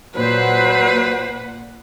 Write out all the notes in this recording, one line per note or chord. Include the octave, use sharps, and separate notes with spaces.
A#2 F#3 B4 C5 F#5